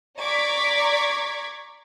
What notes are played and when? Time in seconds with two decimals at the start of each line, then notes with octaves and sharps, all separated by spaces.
0.20 D5 A#5 C#6 D6 G#6 B6